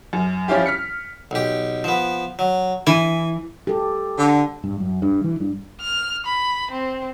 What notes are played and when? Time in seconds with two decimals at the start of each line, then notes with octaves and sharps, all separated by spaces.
0.13 F#2
0.48 F3 G3 C#4 E4 F4 G4
0.66 F6 B6 C#7
1.31 B1 G4
1.84 F3 B3
2.39 F#3
2.87 E3 G#5
3.67 G4 A4
4.18 D3
4.64 G2
4.80 F#2
5.02 G2
5.24 E3
5.40 G2
5.81 F6
6.26 B5
6.71 C4